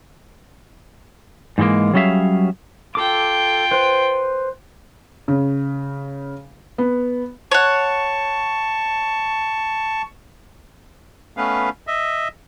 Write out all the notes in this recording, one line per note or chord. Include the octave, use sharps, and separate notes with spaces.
G#2 E3 F3 G#3 A#3
F#3 G3 C#4 G#4 E5 F5
F4 A4 G5 D6
B4 C5
C#3
B3
C#5 F#5 A5 C#6
A3 B3 C#4 B4 F5
D#5 E5